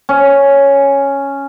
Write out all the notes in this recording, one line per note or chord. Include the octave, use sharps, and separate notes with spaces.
C#4